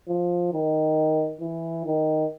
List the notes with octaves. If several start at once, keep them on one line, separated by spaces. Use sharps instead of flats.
F3
D#3
E3
D#3